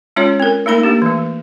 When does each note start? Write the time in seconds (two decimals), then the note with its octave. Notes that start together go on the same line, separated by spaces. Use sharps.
0.16 G#3 C#4 F4 C#5
0.40 C4 A#4
0.66 A3 A#3 D#4 A#4 B5
0.83 A#3 D4 G4
1.02 E3 A3